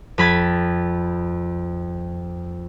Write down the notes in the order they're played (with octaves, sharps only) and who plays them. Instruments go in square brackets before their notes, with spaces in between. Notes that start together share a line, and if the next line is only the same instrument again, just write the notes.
[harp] F2 B5 G#6 A6